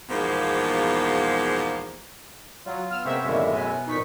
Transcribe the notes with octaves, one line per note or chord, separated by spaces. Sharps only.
E2 G#2 B2 F3 A#3
F#3 F4
B3 E6 F6
C3 G#3 A#3 C4 C#4 E5
F#2 A2 D3 D#3 G#3 A#3
B2 G#5
F2 A#2 D#4 C#6 B6